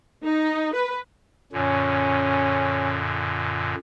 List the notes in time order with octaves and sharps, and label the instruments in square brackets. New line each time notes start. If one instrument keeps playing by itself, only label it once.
[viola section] D#4
B4
[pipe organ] F#2 A#2 D3 [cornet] C#4